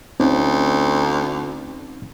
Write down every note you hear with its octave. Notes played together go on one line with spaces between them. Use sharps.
D2 C4 C#4 D#4